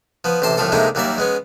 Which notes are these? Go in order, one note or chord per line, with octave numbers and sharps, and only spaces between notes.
F3 B3
A1 C3 C5 A5
C2 A2 F3 F4 A4
A2 C3 G#3 A#3 D4 D#4
D#2 F#3 G3 A#3 D5 E5
G#3 B3 C#4